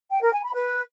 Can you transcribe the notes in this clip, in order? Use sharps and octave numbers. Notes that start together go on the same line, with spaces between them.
G5
A#4
G#5
B5
B4